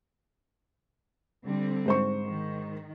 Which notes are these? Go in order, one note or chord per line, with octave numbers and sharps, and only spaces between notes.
D3 G3 C4
G#2 C5 C#6
D#3